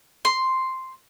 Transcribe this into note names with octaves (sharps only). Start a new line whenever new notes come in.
C6